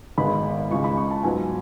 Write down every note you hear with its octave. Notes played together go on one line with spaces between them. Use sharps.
G#1 G#2 G#3 B3 B5
C#2 C#3 G#3 C#6
B5
C#6
A5
G#2 F#3 B3 G#5